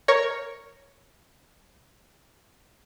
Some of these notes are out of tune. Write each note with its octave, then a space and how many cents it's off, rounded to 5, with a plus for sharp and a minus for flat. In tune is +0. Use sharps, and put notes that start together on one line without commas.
A#4 +0 C#5 +0 A#5 +0